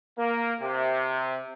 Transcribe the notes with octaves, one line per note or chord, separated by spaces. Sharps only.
A#3
C3